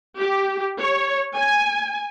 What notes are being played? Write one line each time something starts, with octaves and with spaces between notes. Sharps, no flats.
G4
C#5
G#5